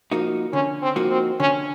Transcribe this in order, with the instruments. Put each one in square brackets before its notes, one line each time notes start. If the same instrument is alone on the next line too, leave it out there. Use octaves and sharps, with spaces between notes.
[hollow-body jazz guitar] F3 A#3 D#4 F#4
[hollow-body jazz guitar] D3 [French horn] C#4
[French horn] C4
[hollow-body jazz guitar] F3 A#3 D#4 F#4
[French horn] C4
[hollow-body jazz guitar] D3 [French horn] C#4